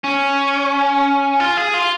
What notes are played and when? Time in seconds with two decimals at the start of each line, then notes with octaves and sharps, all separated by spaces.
0.04 C#4
1.40 F4
1.57 G#4
1.74 F4